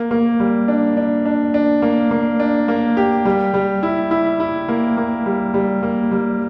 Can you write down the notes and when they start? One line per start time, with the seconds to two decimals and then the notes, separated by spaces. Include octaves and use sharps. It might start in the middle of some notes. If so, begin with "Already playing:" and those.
Already playing: A#3
0.11 A#3
0.40 G3
0.68 D4
0.97 D4
1.26 D4
1.54 D4
1.82 A#3
2.11 A#3
2.40 D4
2.68 A#3
2.97 G4
3.25 G3
3.54 G3
3.83 E4
4.11 E4
4.40 E4
4.69 A#3
4.97 A#3
5.26 G3
5.54 G3
5.83 A#3
6.12 G3